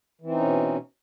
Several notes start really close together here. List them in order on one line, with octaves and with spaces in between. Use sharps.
E3 C4 D#4 C#4 B2